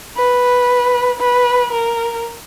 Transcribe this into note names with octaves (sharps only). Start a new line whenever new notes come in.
B4
B4
A#4